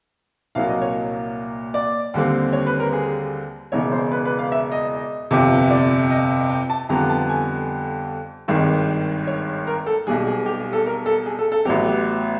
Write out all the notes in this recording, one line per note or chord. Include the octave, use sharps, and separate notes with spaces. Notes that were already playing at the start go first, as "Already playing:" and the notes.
C2 A#2 F#3 A#3 F5
D#5
C#5
D5
D#2 D3 G3 C4
C#5
B4
A#4
G#4
E1 E2 C#3 C#5
C5
B4
B4
F5
E5
D#5
G1 F2 C3
D5
D#5
G5
A5
F2 D3 G3 B3 A#5
A5
G#5
G#1 G2 D#3 G#3
C#5
A#4
A4
B1 B2 G3 G#4
G#4
G4
G#4
A4
A#4
A4
G#4
A4
A4
A1 A2 F#3 B3 G4
G4